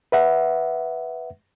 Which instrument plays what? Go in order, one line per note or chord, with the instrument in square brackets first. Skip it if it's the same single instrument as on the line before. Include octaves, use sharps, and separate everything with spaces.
[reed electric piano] B4 E5 F#5